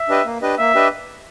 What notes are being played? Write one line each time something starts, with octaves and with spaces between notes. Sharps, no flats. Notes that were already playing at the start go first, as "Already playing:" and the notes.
Already playing: E5
D4 G4 B4 D#5
A#3
D4 G4 B4 D#5
A#3 E5
D4 G4 B4 D#5